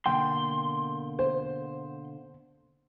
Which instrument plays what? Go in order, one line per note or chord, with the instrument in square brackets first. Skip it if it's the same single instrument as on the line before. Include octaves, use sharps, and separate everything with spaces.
[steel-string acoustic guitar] B2 D3 A#3 [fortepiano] G5 [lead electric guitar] C6
[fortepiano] C5